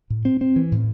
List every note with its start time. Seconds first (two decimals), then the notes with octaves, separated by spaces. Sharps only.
0.10 A2
0.25 C4
0.41 C4
0.56 E3
0.72 A2